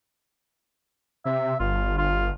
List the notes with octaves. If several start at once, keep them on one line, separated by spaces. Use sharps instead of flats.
C3 E5
G1 F4
F4